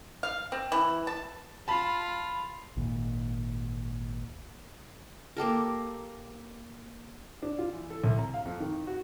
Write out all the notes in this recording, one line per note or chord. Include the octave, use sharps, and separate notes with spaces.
F5
C4
E3
A5
F4 A5 B5
G#1 D#2 A#2
A#3 G4 A4 A#4
D4
F4
E3
A4
C2
A#5
F5
F2
D#3
F#4